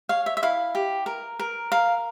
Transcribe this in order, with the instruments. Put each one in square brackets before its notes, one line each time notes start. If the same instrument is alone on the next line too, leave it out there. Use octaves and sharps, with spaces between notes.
[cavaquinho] C#5 F5
E5
E5
E4 F5
G4
A#4
A#4
A#4 F5